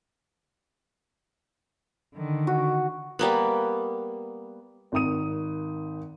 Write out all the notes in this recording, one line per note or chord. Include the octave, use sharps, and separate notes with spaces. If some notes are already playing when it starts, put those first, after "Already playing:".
D3 D#3
F#4
G3 A#3 B3
G#1 D#3 D#6 D#7